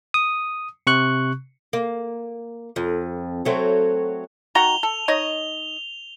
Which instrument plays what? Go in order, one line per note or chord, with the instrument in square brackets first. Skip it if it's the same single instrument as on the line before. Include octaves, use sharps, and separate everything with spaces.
[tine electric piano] D#6
C3 C#6 F#6
[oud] A#3
F2
F#3 A3 C4
[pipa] D#3 F#4 A#5 [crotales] F7 G7
[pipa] A4
D#4 C#5 D#5